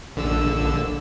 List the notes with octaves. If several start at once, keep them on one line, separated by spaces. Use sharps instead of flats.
A#1 D3 E6